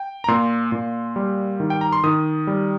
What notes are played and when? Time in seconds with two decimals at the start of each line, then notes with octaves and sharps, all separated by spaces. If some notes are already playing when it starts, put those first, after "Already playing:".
Already playing: G5
0.24 A#5
0.28 A#2 C6
0.72 A#2
1.16 G3
1.60 D#3
1.70 G5
1.81 A#5
1.93 C6
2.04 D#3 D#6
2.47 G3